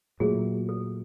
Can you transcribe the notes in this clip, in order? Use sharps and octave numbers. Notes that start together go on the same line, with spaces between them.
A#2 F#3 A3 G#4
A4